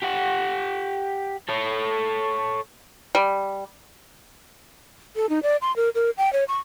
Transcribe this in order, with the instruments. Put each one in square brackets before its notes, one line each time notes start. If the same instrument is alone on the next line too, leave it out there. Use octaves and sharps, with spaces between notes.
[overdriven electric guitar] G4 F#5
A4 C#5
[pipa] G3
[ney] A4
D#4
D5
C6
A#4
A#4
G5
C#5
C#6